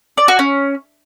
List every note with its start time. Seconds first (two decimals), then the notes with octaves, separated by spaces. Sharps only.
0.17 D5
0.28 F#4
0.39 C#4